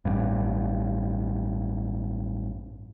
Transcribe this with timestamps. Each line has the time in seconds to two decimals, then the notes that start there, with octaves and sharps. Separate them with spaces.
0.05 A1 G2